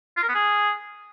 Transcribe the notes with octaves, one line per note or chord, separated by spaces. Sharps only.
F4
A#4
B3
G#4